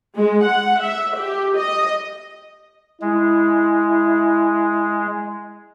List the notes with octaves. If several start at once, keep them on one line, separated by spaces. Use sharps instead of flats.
G#3
F#5
E5
G4
D#5
G#3 E4